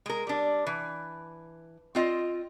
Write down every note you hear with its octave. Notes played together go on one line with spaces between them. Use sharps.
G#3 A#4
G3 D4
E3
C4 F4 D#5